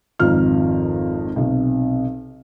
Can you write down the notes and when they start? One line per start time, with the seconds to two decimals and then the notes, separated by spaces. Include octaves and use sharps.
0.19 G#1 F2 D#3 F3 F6
1.36 B1 C3